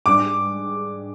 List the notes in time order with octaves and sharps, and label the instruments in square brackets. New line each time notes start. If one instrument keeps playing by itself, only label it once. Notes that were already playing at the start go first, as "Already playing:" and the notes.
[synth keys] G#2 G3 D4 G#4 [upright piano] D6